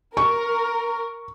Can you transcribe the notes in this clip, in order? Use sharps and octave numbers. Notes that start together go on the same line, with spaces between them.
A#4 C#6